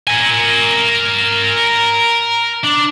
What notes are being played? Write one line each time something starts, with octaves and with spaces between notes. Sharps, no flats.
A#4 G#5
D4